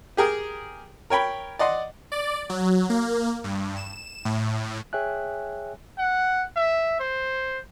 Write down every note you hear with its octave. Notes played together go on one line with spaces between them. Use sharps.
G4 G#4 A#4
A#4 C#5 G5 B5
D5 D#5 F#5 C6
D5
F#3
A#3
G2
E7
A2
G#4 C#5 E5 G5 G#5 F#6
F#5
E5
C5